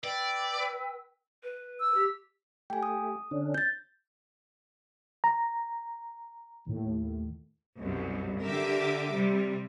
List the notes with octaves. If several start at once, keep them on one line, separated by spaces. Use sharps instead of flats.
B4 D5 G5 E6
B4
E6
G4
A3 G4 G5 G#5
D#6
D3 C#4 D4
G6 A6
A#5
D#2 A2
C2 F#2 B2
D3 G4 A#4 E5 D6
C3 G3